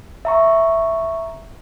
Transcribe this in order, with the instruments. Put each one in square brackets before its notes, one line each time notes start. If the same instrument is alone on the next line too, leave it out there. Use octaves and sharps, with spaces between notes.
[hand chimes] E5 A#5 C#6